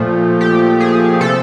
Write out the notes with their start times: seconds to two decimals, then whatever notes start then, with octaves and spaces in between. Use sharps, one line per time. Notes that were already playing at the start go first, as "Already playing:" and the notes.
Already playing: A#2 F3 A3
0.41 G4
0.80 G#4
1.20 C3 F3 A3 A4